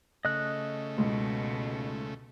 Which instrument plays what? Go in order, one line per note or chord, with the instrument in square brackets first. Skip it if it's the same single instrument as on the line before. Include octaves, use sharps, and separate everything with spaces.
[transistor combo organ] C#3 A3 [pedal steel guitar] D#5 F#6
[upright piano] C#2 G#2 [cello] B2